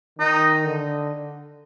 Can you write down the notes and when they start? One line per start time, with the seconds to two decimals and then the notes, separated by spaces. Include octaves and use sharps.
0.19 D#3 D#4
0.65 D3